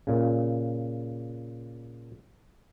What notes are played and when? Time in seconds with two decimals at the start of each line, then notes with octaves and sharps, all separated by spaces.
0.07 A#2 C#3